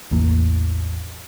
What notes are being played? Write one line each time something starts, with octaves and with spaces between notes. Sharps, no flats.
A1 E2 E3 A#3